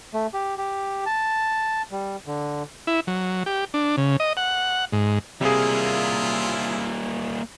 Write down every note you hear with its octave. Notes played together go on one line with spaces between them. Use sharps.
A3
G4
G4
A5
G3
D3
E4
F#3
G4
D4
C#3
D#5
F#5
G#2
C3 G3 A#3 E4 F4 G#4